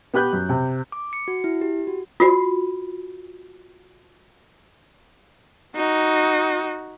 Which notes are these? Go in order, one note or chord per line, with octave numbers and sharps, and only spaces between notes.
B3 G4 B4 F#6 G6
F#2
C3
D6
C#7
F#4
E4
G4
F#4
F4 F#4
D#4 F#4